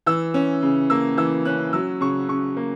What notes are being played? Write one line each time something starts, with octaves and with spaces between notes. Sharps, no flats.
E3 E6
C#4
C#3
A#3 E6
E3 E6
C#4 F#6
F#3 E6
C#3 C#6
C#3 C#6
A#3